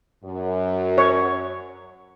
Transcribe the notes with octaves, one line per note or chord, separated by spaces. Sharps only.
F#2
C#5